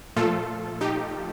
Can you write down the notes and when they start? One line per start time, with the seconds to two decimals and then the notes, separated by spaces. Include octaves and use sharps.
0.16 A#2 F3 A3 F4 A4
0.81 D#4 G4